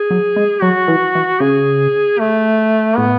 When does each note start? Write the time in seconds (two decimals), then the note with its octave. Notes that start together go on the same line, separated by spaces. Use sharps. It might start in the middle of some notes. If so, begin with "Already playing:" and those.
Already playing: G#4
0.11 F#3
0.36 G#3
0.62 F#3 F#4
0.88 E3
1.15 E3
1.40 C#3 G#4
2.20 A3
2.98 A2 B3